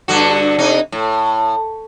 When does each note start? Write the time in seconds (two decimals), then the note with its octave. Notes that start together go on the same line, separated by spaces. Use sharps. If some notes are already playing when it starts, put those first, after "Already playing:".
0.08 G2 D3 F#4
0.59 C3 D#4
0.92 A2